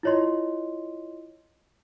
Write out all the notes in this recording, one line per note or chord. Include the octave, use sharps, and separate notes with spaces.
E4 F4 C#5 D#5 C6